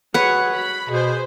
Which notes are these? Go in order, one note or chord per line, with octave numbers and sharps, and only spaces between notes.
F#3 G#4 B4 C#5 F#5
B5
B2 G#4 C5